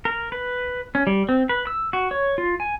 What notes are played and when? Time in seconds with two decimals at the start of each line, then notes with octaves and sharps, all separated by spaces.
0.05 A#4
0.32 B4
0.95 C#4
1.07 G3
1.29 C4
1.49 B4
1.67 E6
1.93 F#4
2.11 C#5
2.38 F4
2.60 G#5